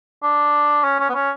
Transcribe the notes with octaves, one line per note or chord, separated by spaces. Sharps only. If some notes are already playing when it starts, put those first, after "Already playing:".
D4
C#4
C#4
B3
C#4